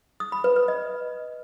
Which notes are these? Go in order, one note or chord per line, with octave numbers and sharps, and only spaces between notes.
D#6
B5
B4
B4
D#5